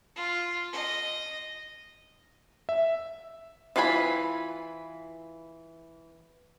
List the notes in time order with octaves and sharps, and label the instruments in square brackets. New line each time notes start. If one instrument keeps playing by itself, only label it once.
[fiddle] F4
D#5
[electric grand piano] E5
[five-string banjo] E3 F4 B4 G#5 B5